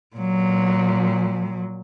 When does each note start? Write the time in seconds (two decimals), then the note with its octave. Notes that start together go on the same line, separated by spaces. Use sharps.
0.16 A#2 F#3